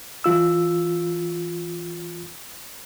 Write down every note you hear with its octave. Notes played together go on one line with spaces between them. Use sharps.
E3 F4 E6